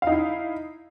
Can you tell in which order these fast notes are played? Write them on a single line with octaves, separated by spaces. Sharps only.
F5 D#4 E4